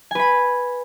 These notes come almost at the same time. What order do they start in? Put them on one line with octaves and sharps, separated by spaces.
G#5 B4 B5